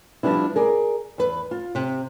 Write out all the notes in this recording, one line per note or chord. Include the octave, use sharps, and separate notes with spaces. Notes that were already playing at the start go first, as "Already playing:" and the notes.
F3 G3 B3 D4 E4
G#4 A#4 D5
E2 B4
F4
C3